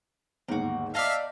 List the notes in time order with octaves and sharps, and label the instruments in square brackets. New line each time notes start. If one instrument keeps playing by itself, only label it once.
[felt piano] G1 D#2 G#2 [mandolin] A#3 F#4
[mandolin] D#4 D5 [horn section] E5 F5 [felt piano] A5